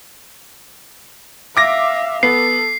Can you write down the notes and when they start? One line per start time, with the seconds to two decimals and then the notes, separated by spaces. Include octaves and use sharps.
1.57 E5 F5 D6 A#6
2.23 B3 A4 C7